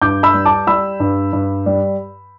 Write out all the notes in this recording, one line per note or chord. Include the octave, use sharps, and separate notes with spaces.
G2 D6 G6
B5 E6
G3
A5 D6
G3 B5 E6
G2
G2
G3